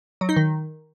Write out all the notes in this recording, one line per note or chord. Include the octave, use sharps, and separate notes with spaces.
F#3
D#4
D#3